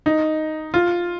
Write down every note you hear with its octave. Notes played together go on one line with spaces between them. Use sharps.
D#4
F4